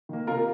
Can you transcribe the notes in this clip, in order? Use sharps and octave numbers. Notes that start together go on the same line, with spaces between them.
D#3 A#3
C3 F4 A#4